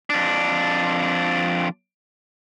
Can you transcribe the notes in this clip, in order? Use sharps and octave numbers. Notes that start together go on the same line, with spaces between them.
F2 D4